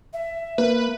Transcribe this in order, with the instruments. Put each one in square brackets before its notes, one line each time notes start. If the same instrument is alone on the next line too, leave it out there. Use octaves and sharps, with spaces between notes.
[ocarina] E5
[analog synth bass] A#3 [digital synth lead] B4